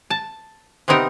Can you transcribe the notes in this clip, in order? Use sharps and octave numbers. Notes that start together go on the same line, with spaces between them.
A5
C3 B3 C4 D#4 A#4